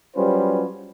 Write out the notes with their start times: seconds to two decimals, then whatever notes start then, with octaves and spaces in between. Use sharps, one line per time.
0.17 F#3 G3 C#4 F4 B4 C5